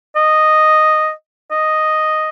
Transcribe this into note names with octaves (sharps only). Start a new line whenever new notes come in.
D#5
D#5